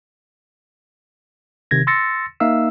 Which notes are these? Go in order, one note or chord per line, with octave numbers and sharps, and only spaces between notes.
C3 D#3 G#6 A#6
C6 E6 A6 A#6 C#7
A#3 D#4 E5 F5 E6